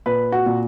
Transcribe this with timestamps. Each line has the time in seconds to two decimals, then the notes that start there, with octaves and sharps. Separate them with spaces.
0.06 A#2 B4
0.32 F#4
0.46 A#2